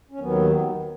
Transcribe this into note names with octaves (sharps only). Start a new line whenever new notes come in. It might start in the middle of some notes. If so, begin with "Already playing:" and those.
C#4
D#2 D#3 F#3 B3